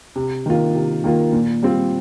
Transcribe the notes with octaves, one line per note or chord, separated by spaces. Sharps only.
C3
D#3 A#3 F4
C3
D#3 A#3 F4
A#2
G3 C4 F4